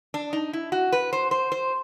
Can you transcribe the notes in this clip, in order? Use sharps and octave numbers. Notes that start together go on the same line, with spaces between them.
D4
D#4
E4
F#4
B4
C5
C5
C5